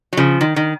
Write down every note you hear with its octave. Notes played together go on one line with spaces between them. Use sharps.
F#3
C#3 F3
D#3
D#3